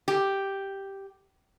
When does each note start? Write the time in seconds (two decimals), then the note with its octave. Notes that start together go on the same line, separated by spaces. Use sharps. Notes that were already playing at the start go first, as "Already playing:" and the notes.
0.08 G4